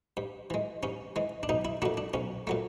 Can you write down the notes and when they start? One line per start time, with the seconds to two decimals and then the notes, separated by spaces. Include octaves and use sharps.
0.17 G2
0.50 E3 G#3
0.83 G2 C#4
1.16 E3 G#3
1.43 D4
1.49 B1 D#4
1.65 E4
1.82 A#2 F#3 A3 D4
1.97 D4
2.14 B1 C#4
2.47 A#2 F#3 A3